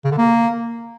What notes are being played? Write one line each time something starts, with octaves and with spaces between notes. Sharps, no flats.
C#3
D3
A#3